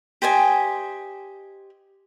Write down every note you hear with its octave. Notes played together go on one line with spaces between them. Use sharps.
G4 C5 D#5 G#5